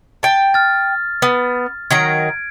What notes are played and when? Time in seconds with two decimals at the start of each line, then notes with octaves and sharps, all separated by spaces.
0.23 G5 A5
0.54 F6 A6
1.22 B3
1.91 D#3 F#3 A#5 G#6 D7